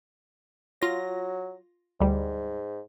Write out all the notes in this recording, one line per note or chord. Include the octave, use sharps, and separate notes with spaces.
F#3 F4 A#6
D2 G#2 G3